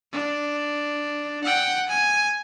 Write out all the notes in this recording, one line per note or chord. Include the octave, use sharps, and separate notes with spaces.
D4
F#5 G5
G#5